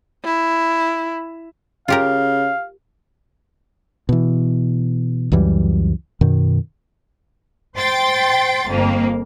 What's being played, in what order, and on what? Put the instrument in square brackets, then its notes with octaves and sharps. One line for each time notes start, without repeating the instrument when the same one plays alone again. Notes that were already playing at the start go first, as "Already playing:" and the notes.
[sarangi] E4
[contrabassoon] C#3 [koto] F4 G4 A#4 [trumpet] F5
[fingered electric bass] B2 E3
C#2 F#2 E3 G3
F#2 B2 D#3
[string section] C5 G5 C6 A6
G1 F2 A#3